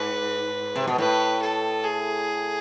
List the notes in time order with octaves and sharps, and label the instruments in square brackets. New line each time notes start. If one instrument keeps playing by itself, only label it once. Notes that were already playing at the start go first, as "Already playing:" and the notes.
Already playing: [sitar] G#2 [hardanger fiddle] B4
[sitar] C3
B2
[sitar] A2 [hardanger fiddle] B4
[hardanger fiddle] A4
G#4